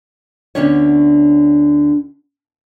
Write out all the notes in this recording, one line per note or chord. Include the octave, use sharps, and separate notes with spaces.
D2 D3 B3 C#4 D4 C#5